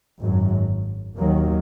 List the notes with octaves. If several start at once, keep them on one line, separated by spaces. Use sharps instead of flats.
G#1 F#2 F#3
D#2 D#3 F#3 A#3